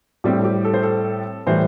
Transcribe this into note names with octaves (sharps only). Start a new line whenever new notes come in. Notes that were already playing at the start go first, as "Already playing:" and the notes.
A2 G3 C4 G4
A4
G4
A4
C5
A4
A2 E3 G3 C5